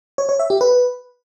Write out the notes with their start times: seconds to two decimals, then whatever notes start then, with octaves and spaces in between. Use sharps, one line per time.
0.18 C#5
0.29 C#5
0.39 E5
0.50 G4
0.61 B4